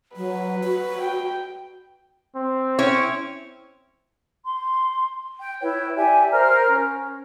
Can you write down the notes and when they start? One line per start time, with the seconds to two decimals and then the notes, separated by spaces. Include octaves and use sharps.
0.17 F#3 B4
0.64 F#4
1.02 G5
2.36 C4
2.79 C#4 E4 C#5
4.44 C6
5.39 G5
5.60 E4 B4 C#5 G5
5.95 G4 D5 E5 G#5
6.31 A#4 C5 A#5 F6
6.68 C#4